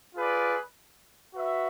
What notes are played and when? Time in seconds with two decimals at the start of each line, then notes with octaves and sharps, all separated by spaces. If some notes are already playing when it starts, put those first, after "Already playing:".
0.15 F4 G#4 B4 D5
1.34 F#4 B4 E5